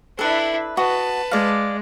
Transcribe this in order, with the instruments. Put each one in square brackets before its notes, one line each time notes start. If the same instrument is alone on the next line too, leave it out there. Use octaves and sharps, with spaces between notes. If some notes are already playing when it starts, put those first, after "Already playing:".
[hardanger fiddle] D4 E4 [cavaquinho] A4 B4
[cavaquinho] F#4 D#5 [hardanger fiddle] B4 A5
[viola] G#3 [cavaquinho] D5 F5